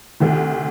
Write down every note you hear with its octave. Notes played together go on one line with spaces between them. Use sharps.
D2 C3 D#3 A3